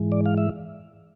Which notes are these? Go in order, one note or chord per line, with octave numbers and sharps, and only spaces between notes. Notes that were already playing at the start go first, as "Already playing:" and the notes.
Already playing: G#2 E3 G#3
D5
F5
E5